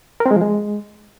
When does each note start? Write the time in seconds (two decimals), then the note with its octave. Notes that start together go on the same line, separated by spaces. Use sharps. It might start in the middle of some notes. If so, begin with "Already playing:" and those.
0.20 A#4
0.26 C4
0.31 G#3
0.36 F3
0.41 G#3